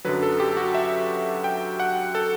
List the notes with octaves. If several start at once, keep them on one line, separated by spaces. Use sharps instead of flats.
F#2 D3 F#3 B4
A4
G4
F#4
E5
G5
F#5
A4